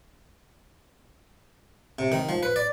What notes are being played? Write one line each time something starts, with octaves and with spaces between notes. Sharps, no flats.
C3
D#3
F3
B4
D5